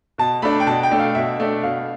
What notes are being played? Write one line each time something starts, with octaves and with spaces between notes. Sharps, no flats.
B2 A5
A3 D4 B5
G5
B2 A5
G5
A3 D4
F5
B2 E5
A3 D4
B2 F5